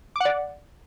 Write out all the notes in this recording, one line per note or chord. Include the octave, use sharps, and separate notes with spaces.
D5 F#5 D6